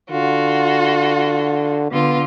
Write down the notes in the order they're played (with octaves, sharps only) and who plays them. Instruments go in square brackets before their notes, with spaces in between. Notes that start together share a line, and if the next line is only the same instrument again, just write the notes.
[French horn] D3 [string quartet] F4 F#4
[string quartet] D3 F4 [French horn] B3